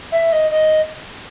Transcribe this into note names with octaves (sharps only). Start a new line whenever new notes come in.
E5
D#5
D#5